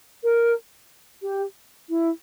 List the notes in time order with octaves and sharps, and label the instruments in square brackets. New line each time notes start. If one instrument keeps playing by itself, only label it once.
[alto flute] A#4
G4
E4